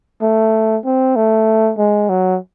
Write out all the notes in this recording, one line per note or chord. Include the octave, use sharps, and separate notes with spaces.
A3
C4
A3
G#3
F#3